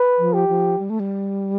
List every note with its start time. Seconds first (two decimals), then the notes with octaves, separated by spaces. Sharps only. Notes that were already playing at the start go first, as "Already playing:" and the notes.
Already playing: B4
0.18 F3
0.34 G4
0.49 F3
0.79 G3
0.90 A3
1.00 G3